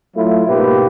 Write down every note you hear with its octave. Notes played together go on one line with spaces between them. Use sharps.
F#3 A3 E4 F4
G#2 B2 A#3 G4 B4